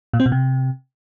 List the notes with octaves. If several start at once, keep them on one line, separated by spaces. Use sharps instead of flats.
A#2
C4
B2
C3